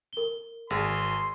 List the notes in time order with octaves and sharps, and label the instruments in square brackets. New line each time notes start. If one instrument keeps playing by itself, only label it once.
[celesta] A#4 G7
[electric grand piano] G#1 G#4 [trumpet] C6